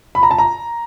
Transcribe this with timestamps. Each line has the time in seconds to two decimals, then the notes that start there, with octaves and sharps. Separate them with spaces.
0.15 B5
0.23 A#5
0.31 A5
0.38 A#5